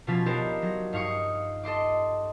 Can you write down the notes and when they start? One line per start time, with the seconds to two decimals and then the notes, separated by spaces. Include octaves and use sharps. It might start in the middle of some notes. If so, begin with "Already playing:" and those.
0.07 B2 F3 C#4 F4 A6 B6
0.26 B3 D4 D#4 G4 A#4 C5
0.62 F#3 A#6
0.93 G2 D#4 F5 C#6 D#6 C#7
1.63 A4 D#5 C6 D6